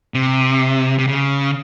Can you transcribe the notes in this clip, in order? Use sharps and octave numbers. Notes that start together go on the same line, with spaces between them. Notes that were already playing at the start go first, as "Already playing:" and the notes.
C3
C3
C#3